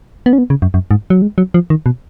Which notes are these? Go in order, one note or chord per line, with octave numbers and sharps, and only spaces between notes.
B3
C#4
B3
C#3
F#2
F#2
G#2
F#3
G#3
F#3
F3
D#3
B2